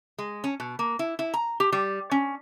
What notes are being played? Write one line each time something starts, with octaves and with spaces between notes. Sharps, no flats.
G#3
C#4
B2
A#3
E4
E4
A#5
G4
G3
C#4